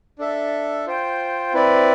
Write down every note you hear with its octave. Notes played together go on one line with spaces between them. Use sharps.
D4 A4 E5
F4 C5 G5
C4 E4 B4 D5